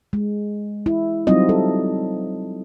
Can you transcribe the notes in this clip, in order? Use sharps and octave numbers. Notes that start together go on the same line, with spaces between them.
G#3
E4
F#3 G3 C4 D#4 F4 D#5
A4